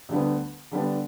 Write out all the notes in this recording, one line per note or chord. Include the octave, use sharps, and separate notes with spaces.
D2 D3 G3 B3
D3 G3 B3 D4